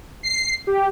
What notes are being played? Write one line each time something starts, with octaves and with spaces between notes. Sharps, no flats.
C7
G4